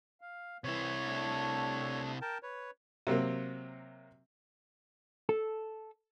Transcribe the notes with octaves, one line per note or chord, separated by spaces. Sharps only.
F5
C3 E3 E4 C#5
A3 D4
A#4 G5 A5
B4 C#5
C3 F#3 A#3 C4
A4